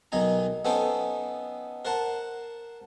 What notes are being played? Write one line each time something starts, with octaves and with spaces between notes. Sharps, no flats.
B1 D#3 D#4 G#5 A#5
B3 C#4 D#4 A4 C5 G5
A#4 C5 F#5 A5